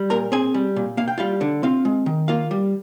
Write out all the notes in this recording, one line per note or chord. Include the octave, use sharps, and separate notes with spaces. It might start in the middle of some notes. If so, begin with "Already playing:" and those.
Already playing: G3
A#2 A#4 A#5
C4 G#4 G#5
G3
A#2
A#3 F5
G5
G3 F4 F5
D3
C4 F4 F5
G#3
D#3
A#3 F4 F5
G3